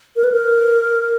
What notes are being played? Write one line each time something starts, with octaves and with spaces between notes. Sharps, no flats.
A#4
B4
A#4